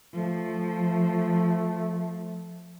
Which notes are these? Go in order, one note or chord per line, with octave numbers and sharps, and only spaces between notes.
F3 A3